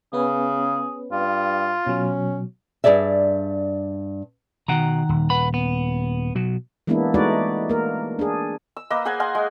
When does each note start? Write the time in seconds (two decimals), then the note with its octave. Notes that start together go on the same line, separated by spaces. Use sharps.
0.13 C#3 B3 C#4 G#4 B4
1.12 G2 F4
1.87 B2 F#3 C#4
2.84 G2 F#3 G#4 D5 E5
4.68 B2 D#3 F#5 A#5
5.09 D#1
5.30 B4 F#5 B5
5.54 B3
6.35 B2 F#3
6.87 E3 G#3 A#3 B3 D4 E4
7.14 G#3 A3 D#4 F#4 B4 D5
7.69 A#3 A#4
8.19 D4 G#4
8.76 E6
8.90 A#3 B4 D#5 E6
9.05 G#4 C5 F#5 G#5
9.20 F5 F#5 G#5 C6
9.35 G#3